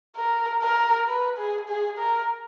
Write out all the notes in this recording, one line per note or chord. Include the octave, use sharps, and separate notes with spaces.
A#4
A#4
B4
G#4
G#4
A#4